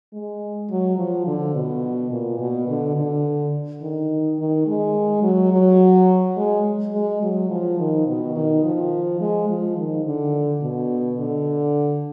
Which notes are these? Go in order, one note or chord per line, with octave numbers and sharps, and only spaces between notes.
G#3
F#3
F3
D3
B2
A#2
B2
D3
D3
D#3
D#3
G#3
F#3
F#3
G#3
G#3
F#3
F3
D#3
B2
D#3
F3
G#3
F3
D#3
D3
B2
D3